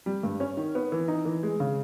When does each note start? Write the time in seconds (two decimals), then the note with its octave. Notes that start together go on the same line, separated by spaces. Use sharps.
0.06 G3
0.23 G2
0.40 C#4
0.57 D#3
0.75 B3
0.92 E3
1.08 D#4
1.25 E3
1.43 G#3
1.60 C#3